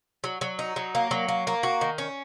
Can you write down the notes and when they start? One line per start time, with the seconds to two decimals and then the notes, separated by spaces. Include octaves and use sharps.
0.24 F#3
0.41 F#3
0.59 D#4
0.76 F#3
0.95 A#3
1.11 F#3
1.28 A#3
1.47 A#3
1.63 F#4
1.81 D#3
1.98 C#4